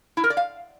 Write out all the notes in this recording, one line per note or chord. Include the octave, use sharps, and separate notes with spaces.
E4
A#4
D5
F5